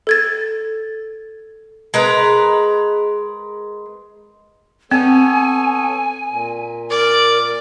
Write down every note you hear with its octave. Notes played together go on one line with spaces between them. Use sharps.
A4 G#6 A6
G#3 A#4 B4
B3 C4 A4 C#5 G#5
A#2
A#4 D5